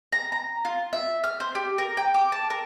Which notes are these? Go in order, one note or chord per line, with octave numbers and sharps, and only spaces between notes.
A#5
A#5
F4
E5
F6
C5
G4
A#4
G5
D6
A5
A#4